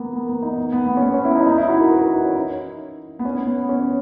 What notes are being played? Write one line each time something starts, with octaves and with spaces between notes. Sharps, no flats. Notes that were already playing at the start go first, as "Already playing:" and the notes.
Already playing: A#3 B3
A#3
B3
D#4
B3
B3
B3
C#4
B3
C#4
E4
D#4
D#4
E4
F#4
A#4
B4
F#4
D#4
C#4
D#4
B3
C#4
B3
C#4